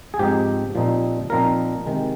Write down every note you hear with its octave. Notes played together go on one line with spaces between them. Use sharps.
G#4
G#2 F3 C4 D#4 G4
A#2 F3 C4 D#4
A#2 F3 C4 D#4 A#4
C3 D#3 G#3